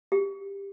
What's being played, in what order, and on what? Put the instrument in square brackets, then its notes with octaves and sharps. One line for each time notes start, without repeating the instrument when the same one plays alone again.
[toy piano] G4